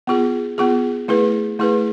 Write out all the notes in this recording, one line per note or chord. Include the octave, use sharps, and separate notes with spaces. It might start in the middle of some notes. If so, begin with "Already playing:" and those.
B3 F4 G#4
B3 F4 G#4
A3 E4 G#4 B4
A3 E4 G#4 B4